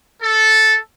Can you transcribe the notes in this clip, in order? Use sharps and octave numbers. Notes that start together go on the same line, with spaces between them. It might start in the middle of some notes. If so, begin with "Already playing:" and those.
A4